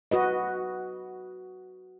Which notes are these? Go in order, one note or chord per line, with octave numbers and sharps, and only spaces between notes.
F#4 B4 D#5